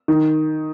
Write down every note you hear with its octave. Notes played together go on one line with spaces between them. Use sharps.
D#3